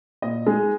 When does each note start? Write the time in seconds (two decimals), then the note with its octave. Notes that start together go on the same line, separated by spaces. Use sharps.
0.22 A#2 D#5
0.47 G#3 D#4